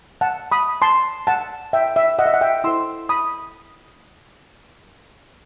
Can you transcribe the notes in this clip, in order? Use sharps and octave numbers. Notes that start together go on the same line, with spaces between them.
F#5 A5
B5 D#6
A5 C6
F#5 A5
E5 G5
E5
D#5 F#5
E5
F#5
E5 G5
E4 A4 C5 C6 E6
B5 D#6